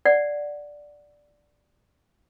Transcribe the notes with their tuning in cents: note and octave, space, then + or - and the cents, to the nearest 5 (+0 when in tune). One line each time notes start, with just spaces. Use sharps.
D5 +0 F#5 +0